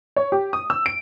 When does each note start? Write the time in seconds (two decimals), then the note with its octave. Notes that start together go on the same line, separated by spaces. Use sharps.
0.16 C#5
0.32 G4
0.53 D#6
0.70 E6
0.86 D7